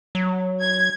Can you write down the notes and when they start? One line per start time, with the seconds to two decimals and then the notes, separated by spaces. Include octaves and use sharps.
0.15 F#3
0.61 G#6